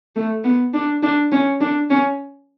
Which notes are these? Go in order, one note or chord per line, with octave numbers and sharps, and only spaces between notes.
A3
B3
D4
D4
C#4
D4
C#4